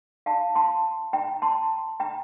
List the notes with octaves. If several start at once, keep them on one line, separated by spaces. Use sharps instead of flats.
F5 A5
A5 C6
G5 A#5
A5 C6
G5 A#5